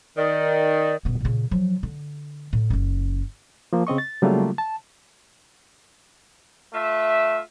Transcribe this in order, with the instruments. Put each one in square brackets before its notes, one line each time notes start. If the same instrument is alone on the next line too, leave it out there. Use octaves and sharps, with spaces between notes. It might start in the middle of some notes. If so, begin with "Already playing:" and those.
[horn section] D#3 [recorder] D5
[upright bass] D#1 B3
A#2 C#3
F3 F#3
D3
A2
F#1 C#4
[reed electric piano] F3 A#3
C#3 C4 D#5 C#6
A6
C#3 F#3 G3 A3 A#3 F4
A5
[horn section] A3 F4 E5